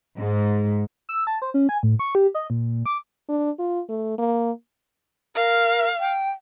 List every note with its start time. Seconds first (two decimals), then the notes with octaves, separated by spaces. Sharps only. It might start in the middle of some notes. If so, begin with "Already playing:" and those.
0.19 G#2
1.09 E6
1.27 A5
1.42 C5
1.54 C#4
1.69 G#5
1.83 A2
1.99 C#6
2.15 G4
2.35 D#5
2.50 A#2
2.86 D6
3.28 D4
3.59 F4
3.89 A3
4.18 A#3
5.36 A#4 F5
6.00 G5